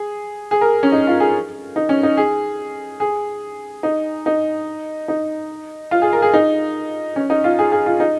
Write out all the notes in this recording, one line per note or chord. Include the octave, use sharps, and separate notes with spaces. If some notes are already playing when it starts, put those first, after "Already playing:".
Already playing: G#4
G#4
A#4
C#4
D#4
F4
G#4
D#4
C#4
D#4
G#4
G#4
D#4
D#4
D#4
F4
G#4
A#4
G#4
D#4
C#4
D#4
F4
G#4
G#4
F4
D#4